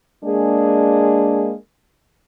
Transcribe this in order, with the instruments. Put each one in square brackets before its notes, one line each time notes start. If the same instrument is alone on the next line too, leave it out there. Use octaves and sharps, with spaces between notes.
[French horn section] G#3 A#3 D4 G#4